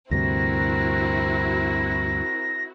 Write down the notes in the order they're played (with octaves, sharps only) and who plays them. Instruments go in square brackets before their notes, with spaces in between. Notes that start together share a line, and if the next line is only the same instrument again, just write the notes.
[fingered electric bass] D2 G2 C3 [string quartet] C4 A#4 [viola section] E4 F#4 [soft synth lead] A#6